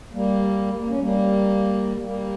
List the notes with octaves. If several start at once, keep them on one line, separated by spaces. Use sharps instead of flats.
G3 A#3
A#3
C#4
G3 A#3
G3 A#3